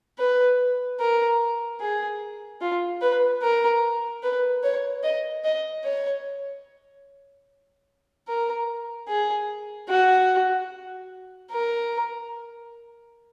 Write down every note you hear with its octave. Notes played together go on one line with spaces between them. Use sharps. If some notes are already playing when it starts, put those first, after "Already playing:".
B4
A#4
G#4
F4
B4
A#4
B4
C#5
D#5
D#5
C#5
A#4
G#4
F#4
A#4